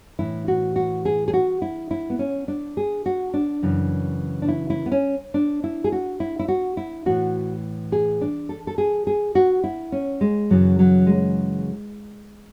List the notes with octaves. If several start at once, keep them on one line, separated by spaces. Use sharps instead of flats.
A2 E3 E4
F#4
F#4
G#4
G#4
F#4
E4
E4
B3
C#4
D4
G#4
F#4
D4
F#2 C#3 E3
D4
E4
E4
B3
C#4
D4
E4
G#4
F#4
E4
E4
F#4
E4
A2 E3 F#4
G#4
D4
A4
A4
G#4
G#4
F#4
E4
C#4
G#3
F#2 C#3 E3 F#3
F#3
G#3